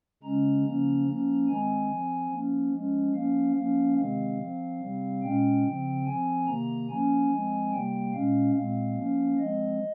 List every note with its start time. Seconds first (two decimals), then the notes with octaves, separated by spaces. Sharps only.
0.23 C#3 G#3 C#4 A#5
0.65 C#3 F3 A#3 C#4
1.06 F3 A#3 C#4
1.48 D#3 G#3 C4 G#5
1.90 F3 C4
2.32 F3 A#3 C#4
2.73 F3 G#3 C#4
3.14 F3 A#3 C#4 F5
3.56 F3 A#3 C#4 F5
3.98 C3 D#3 G#3 C4 F5
4.39 F3 C4
4.81 C3 G3 C4
5.22 A#2 G#3 C#4 G5
5.64 C#3 F3 C4
6.06 F3 C4 G#5
6.47 C3 D#3 A#3 A#5
6.89 F3 A#3 C#4 G#5
7.31 F3 G#3 C4
7.72 C3 G3 A#3 G5
8.13 A#2 G#3 C#4 F5
8.55 A#2 G#3 C4 F5
8.96 F3 A#3 C#4
9.38 F3 G#3 C4 D#5